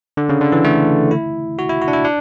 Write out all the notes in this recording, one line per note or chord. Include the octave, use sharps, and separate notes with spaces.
D3
C#3
D3
E3
A3
E4
F#4
E4
F#4
D4
E4
D4